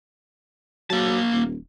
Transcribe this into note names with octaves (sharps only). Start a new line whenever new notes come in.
F#3 A#3 A5
D#1